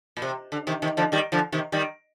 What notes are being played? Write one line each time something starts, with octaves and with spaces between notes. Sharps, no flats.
A#2
C3
D3
C3 D#3
C3 D#3
D3 F3
D#3 G3
D3 F3
C3 D#3
D#3 G3